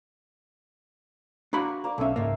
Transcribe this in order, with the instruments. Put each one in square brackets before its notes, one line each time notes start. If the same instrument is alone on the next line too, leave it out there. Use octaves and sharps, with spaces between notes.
[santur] A#3 C#6 [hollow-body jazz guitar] D4 F#4 B5
[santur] A#3 D5
[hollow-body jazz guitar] B1 C#4 [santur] A4 E5 F5
[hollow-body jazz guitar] C#2 G#2 A#3